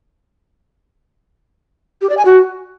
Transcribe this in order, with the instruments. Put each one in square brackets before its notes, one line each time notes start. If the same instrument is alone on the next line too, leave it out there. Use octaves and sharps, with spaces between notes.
[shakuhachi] G4
D5
G#5
F#4